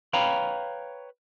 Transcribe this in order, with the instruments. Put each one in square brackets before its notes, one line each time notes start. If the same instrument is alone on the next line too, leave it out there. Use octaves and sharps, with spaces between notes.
[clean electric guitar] B4 C#5 F5 G5 A#5 B5